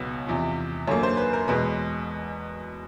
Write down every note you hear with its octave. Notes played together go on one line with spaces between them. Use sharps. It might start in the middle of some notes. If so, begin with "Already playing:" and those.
Already playing: C#2 B2 F#3 B3
E2 C3 F3
F#2 D3 F#3 A#3 C#5
C5
B4
A#4
E2 B2 G#3 B4